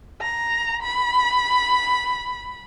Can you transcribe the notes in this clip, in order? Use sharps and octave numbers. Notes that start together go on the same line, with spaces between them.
A#5
B5